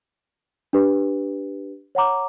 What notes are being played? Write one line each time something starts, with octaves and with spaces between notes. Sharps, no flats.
D4 G4 B4
C#5 F#5 A#5 D6